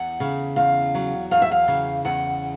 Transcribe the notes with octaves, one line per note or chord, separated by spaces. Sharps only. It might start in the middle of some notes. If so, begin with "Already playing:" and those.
Already playing: E2 F#5
C#3
E2 F5
F#3
E2 F5
E5
F5
C#3
E2 F#5